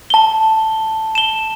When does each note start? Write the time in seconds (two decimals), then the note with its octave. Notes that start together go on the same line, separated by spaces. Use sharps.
0.10 A5 G7
1.15 E7 G7